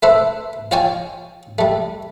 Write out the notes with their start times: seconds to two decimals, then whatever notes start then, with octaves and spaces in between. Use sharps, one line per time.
0.03 A3 B4 C5 E5
0.71 F4 C#5 D5 G5 G#5
1.59 G3 A3